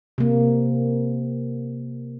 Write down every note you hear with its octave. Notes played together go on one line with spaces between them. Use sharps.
C3 A#3